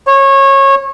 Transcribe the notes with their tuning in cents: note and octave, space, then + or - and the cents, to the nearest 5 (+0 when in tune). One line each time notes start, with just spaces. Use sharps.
C#5 -25